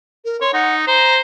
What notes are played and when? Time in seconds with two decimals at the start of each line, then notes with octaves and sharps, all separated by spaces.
0.25 A#4
0.41 C#5 C6
0.54 D#4 F#5
0.87 C5 A#5